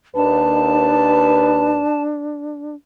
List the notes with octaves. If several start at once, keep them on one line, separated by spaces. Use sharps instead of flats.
D#2 D4 B4 A5